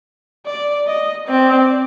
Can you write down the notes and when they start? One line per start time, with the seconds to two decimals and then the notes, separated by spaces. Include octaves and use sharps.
0.46 D5
0.87 D#5
1.28 C4 D5